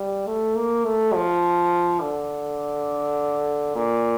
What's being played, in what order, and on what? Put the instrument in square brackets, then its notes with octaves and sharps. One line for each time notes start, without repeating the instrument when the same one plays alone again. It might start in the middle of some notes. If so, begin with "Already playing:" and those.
Already playing: [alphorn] G3
A3
A#3
A3
F3
D3
A#2